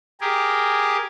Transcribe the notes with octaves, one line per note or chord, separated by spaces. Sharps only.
G4 G#4 A#4